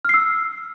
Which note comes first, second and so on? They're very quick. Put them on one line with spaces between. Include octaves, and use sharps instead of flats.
F6 C7 E6